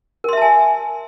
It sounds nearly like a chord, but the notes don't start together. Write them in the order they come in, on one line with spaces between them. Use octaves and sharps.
A#4 C6 E5 A5 G#5